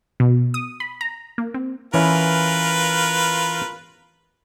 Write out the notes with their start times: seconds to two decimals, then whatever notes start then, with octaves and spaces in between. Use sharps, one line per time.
0.20 B2
0.54 D#6
0.80 B5
1.01 A#5
1.38 A#3
1.54 C4
1.94 E3 C#4 E4 F4 A#4 B4